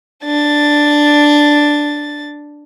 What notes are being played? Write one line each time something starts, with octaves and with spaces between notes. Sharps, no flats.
D4 A6